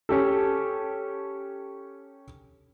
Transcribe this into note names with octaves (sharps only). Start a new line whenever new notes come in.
C#4 G4 A4